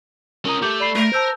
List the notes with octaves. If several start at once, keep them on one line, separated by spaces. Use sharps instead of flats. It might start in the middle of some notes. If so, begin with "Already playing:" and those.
C#4 A#4 D#5 A#5
A3 G4 D6 G6
D5 B5 C7
A3 A#4
C5 A5 E6 G6